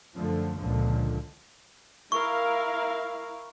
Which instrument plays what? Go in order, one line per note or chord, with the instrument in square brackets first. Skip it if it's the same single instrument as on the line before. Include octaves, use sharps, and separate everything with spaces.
[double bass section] F#2 D3 F3 A3
C#2 A#2 D3 F3
[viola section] E4 A#4 F5 [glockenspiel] C#6